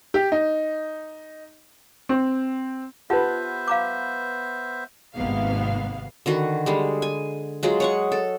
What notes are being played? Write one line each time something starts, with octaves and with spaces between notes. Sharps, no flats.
G4
D#4
C4
B3 F4 G4 B4 C5 E5 F#5 A5
F5 A#5 D6
G#1 G#2 C3 A#3 B3 F5
D3 D#3 F#4 B4
D3 G3 G#3
G#5
F#3 G#3 F4 G#4
C#5 F#5 C#6
A4